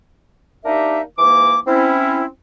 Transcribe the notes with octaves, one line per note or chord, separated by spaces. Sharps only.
A#3 D4 D#4 G4 A#4 E5
G#2 E3 A#3 D6
C4 C#4 E4